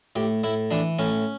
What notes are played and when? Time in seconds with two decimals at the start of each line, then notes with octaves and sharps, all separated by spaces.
0.16 A2 G4
0.44 A2 E4
0.71 E3 D4
0.99 A2 C#4